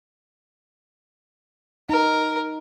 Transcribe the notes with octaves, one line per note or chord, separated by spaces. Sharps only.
D#4 A#4